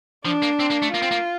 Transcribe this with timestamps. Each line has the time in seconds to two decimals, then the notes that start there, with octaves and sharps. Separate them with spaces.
0.25 F3 D4
0.42 A#3
0.60 C4
0.70 A#3
0.82 A3
0.93 A#3 F4
1.02 C4
1.11 A#3